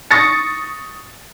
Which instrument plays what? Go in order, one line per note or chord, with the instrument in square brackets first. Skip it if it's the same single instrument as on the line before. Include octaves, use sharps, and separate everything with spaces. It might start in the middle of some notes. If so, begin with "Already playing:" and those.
[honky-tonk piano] C#6 D#6 A6 A#6 C#7